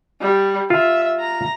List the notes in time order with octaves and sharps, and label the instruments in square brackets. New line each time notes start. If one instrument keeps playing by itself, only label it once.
[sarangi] G3
[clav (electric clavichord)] F4 [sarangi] E5
[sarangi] A#5